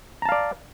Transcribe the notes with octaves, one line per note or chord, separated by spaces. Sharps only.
D5 F5 A5 A#5